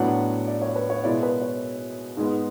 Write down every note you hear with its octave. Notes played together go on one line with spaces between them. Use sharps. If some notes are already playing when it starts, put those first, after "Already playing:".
Already playing: A2 F#3 B3 D4 F#5
D5
C#5
B4
C#5
B2 G#3 B3 E4 D5
B4
C#5
G#2 G#3 B3